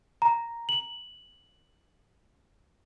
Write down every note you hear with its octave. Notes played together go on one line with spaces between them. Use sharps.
A#5
F#7